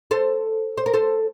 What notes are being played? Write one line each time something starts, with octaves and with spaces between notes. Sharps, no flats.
A4 C5
C5
A#4
A4 C5